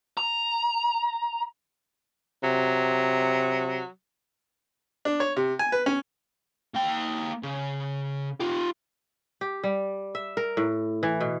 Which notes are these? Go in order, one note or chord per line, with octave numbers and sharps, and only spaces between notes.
A#5
C3 F#3
D4
C#5
C3
G#5
B4
C#4
A#3 G5
C#3
F4 G4
G4
G3
E5
A#4
A2
E3
B2